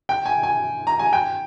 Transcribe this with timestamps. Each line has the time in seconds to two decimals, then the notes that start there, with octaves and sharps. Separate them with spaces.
0.09 G5
0.26 G#5
0.43 G#5
0.87 A#5
0.99 G#5
1.13 G5